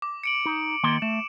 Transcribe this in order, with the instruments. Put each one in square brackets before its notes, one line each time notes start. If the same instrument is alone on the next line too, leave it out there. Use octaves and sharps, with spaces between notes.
[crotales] D6
C#7 D7 F#7
[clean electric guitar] D#4
D#3 A#3 C6
[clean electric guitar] A3 [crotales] E7